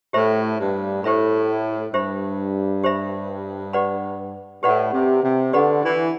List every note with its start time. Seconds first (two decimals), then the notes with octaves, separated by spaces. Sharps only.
0.13 A2 G4 C5 E5 B5
0.59 G2
1.04 A2 G4 C5 E5 B5
1.93 G2 G4 C5 E5 B5
2.84 G4 C5 E5 B5
3.73 G4 B4 D5 F#5 B5
4.63 A2 G4 B4 D5 F#5 B5
4.93 C3
5.23 C3
5.53 D3 G4 B4 D5 F#5 B5
5.84 E3